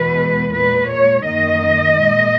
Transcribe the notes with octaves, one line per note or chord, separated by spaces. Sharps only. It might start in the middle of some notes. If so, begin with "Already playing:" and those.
Already playing: E2 B2 G#3 B4
A#2 G#3 B4
C#5
F#2 D#3 A#3 D#5
A#2 G#3